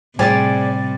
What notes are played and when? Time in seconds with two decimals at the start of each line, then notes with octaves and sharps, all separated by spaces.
0.19 A2 C3 G3 G#4 C5 D5 A6